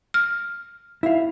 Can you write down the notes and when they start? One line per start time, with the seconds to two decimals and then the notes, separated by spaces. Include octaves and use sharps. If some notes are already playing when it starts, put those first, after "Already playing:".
0.14 F6
1.03 E4 F5